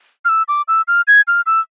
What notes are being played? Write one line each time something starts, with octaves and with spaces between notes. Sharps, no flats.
F6
E6
D6
E6
F6
G#6
F6
E6